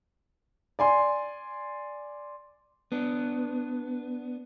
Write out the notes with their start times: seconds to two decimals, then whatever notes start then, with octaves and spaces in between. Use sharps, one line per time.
0.79 D5 G#5 C6
2.92 B3 D4